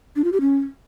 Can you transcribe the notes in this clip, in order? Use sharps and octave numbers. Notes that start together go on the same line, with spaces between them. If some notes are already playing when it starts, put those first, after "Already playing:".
D4
F4
G4
C#4